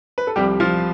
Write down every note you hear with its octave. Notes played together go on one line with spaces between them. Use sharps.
B4
A4
C2 C3 F3 G3 G4
F3 F4